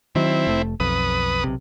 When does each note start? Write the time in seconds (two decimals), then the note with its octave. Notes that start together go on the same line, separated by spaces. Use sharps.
0.15 D#3 F#3 C4 E4
0.47 F1 A3
0.80 B1 F2 B4 D#6
1.44 B1 C3